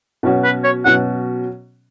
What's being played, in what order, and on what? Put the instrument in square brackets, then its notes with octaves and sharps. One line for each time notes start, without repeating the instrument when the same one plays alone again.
[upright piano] B2 F#3 C#4 F#4
[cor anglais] B4
C#5
[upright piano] B2 F#3 C#4 F#4 [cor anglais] F#5